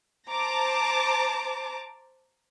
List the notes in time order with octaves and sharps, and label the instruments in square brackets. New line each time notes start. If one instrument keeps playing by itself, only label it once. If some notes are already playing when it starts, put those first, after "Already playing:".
[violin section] C5 A5 A#5 D6